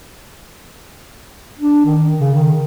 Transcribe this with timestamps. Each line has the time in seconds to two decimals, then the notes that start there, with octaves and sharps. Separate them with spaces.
1.60 D4
1.85 D#3
2.20 C#3
2.35 D#3